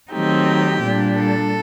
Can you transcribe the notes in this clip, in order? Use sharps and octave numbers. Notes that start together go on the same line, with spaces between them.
D#3 F#3 A3 C4 D#4 G4
A#2 G3 D4
A4